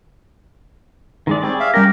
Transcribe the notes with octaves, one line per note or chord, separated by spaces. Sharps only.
D#3 G#3 D5
G3 C4 G#4 C#5 D5
E5 F5
G3 C#4 G4 A#4 A#6